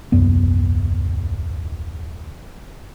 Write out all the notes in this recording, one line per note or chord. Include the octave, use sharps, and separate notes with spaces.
D#1 C2 F#2 B3